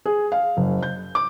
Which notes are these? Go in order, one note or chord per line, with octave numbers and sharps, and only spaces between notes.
G#4
F5
F#1
G6
D6